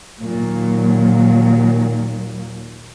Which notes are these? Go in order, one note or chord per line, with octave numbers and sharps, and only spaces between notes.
D#2 A#2 F#3